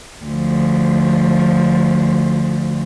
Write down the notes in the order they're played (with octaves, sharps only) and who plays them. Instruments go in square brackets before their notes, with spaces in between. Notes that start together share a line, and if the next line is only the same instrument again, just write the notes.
[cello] D2 F3